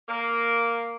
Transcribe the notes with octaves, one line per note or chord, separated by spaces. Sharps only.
A#3